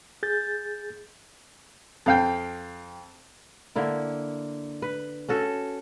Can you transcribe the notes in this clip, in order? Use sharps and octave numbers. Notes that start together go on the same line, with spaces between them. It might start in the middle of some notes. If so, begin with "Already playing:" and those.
G#4 G6 A6
F2 F5 G5
D3 A#3 E4
B4
C#4 F#4 A4